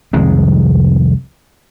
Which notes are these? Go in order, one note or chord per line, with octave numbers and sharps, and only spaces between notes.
C2 F2 D#3 G#3